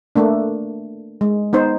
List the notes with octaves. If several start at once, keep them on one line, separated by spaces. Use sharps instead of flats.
A3 A#3 D4
G#3
B3 D#4 C5